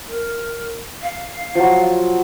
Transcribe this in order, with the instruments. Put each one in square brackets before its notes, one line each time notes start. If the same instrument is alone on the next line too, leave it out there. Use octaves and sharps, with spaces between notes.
[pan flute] A#4
F5
[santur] F3 F#3